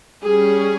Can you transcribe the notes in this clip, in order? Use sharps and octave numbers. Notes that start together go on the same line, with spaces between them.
G3 C#4 G#4